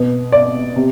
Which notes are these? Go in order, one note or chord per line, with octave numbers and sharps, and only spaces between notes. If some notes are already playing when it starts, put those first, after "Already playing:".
Already playing: B2 B3
D5
C3